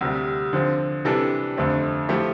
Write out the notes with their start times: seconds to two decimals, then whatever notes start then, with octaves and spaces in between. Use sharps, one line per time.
0.01 D2 C3 G3
0.53 D3 F3 C4
1.05 C3 E3 G3 D4 A4
1.57 F2 D3 A3 C4
2.09 F3 A3 E4 G4